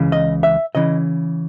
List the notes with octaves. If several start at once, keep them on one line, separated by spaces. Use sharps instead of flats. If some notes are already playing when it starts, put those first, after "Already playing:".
Already playing: C#2 C#3 E3
D#5
E5
C#3 E3 D#5